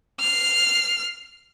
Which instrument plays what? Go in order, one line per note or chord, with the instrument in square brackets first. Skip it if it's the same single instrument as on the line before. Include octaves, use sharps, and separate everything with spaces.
[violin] F6 C7